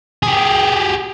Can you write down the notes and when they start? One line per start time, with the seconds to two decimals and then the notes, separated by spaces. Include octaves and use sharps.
0.23 G4 G#4